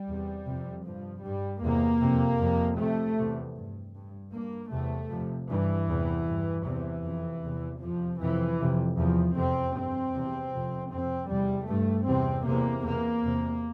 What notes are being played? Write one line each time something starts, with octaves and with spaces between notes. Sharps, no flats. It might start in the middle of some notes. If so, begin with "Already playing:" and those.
Already playing: G3
E2 C3
F2 C3
G2 F3
G2 G3
E2 C3 A#3
F2 C3
F2 C3
F2 C3 A3
E2 C3
G2
G2
G2 A#3
E2 C3 A3
F2 C3
G2 E3
E2 C3
G2
E2 C3 E3
F2 C3
E2 C3
F2 C3 F3
F2 C3 E3
F2 C3
E2 C3 F3
F2 C3 C4
G2 C4
E2 C3
F2 C3
F2 C3 C4
E2 C3 G3
G2 A3
E2 C3 C4
E2 C3 A#3
E2 C3 A#3
E2 C3